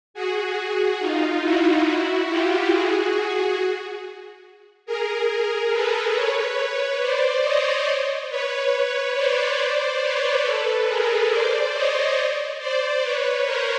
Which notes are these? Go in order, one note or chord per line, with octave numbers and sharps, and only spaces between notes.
F#4 G#4
D#4 F4
E4 F#4
F4 G4
F#4 G#4
G#4 A#4
A4 B4
B4 C#5
C5 D5
C#5 D#5
B4 C#5
B4 C#5
C5 D5
B4 C#5
A4 B4
G#4 A#4
C5 D5
C#5 D#5
C5 D5
B4 C#5
A#4 C5